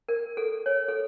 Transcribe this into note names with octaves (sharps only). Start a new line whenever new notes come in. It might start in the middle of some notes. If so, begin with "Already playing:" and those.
A#4
A4
C#5
A4